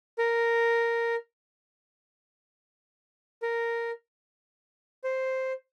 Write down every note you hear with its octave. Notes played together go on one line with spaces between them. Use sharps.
A#4
A#4
C5